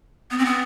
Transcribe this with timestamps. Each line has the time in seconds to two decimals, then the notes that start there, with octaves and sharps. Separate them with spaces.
0.31 B3
0.38 C4
0.45 B3